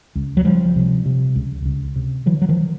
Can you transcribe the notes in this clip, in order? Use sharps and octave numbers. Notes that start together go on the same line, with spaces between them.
C#2
F#3
C#2 F3 G3
C3
C3
C#2
C#2
C3
D3 E3 F#3
F#3
D#3 F3